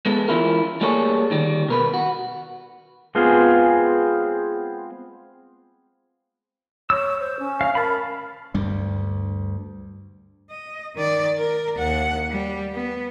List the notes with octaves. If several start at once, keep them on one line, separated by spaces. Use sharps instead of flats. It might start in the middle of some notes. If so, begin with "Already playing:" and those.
G#3 B3 A4
E3 C#4 E4 F4 A#4
G3 A3 A#3 G#4 A4 C#5
D2 D#3 G3
B2 A#4 B4
F#4
G#3 B3 C4 F4 G#4
C#5 E6
C5
C#4
F5
A#4 A5 B5
D2 G2 G3
D#5
D#3 D5
A#4
D#2 F#5
G3
B3